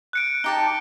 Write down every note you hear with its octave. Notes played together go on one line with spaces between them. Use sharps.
F#6 C#7 D7
D#4 G4 A5 G7